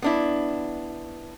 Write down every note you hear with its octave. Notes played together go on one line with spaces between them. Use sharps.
B3 D4 E4